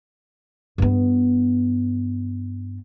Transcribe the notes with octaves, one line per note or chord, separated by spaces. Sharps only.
G2 B3